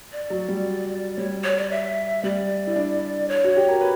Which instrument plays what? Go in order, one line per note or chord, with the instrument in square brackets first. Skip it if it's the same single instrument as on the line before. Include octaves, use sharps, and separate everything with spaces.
[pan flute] D5
[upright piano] F#3
G3
[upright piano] G3 [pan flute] C#5
[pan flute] C#5
D5
E5
[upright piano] G3 [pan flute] D5
[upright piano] E4
D4
[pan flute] C#5
[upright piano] F#4
G4
A#4
B4